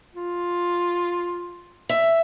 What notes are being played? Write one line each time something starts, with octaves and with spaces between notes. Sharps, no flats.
F4
E5